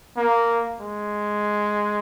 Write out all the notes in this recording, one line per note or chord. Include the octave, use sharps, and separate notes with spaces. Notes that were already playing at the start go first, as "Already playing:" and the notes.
A#3
G#3